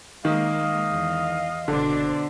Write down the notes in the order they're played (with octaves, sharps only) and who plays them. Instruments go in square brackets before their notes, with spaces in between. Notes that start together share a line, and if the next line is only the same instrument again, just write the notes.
[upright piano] D#3 [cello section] G#3 A#3 [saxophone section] D#5 F5
[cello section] E2
[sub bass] F#1 [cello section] B2 D4 C5 [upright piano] D3